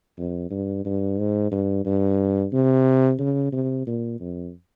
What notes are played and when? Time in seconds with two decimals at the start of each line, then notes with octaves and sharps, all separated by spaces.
0.18 F2
0.50 G2
0.85 G2
1.19 G#2
1.52 G2
1.85 G2
2.53 C3
3.19 C#3
3.53 C3
3.87 A#2
4.20 F2